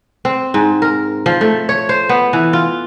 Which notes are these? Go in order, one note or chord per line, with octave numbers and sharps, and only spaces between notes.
C4
G#2
A#4
F3
A3
C#5
C5
B3
E3
F4